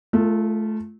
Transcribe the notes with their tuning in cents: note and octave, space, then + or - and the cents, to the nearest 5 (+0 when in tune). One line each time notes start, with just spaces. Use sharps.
A3 -25 F4 -20 A4 +40